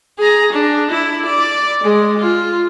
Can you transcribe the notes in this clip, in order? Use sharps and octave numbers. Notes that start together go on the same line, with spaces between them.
G#4 A#5
D4
E4
D5
G#3 G#4
F4